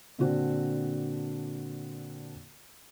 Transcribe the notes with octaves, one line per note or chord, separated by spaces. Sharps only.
A#2 D3 C4 D4 F#4